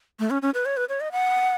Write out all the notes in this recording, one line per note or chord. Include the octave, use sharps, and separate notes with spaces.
A3
C#4
C#4
B4
C#5
B4
C#5
D#5
F#5